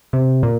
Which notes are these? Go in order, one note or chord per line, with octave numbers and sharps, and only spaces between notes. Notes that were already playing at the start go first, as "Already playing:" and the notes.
C3
A#2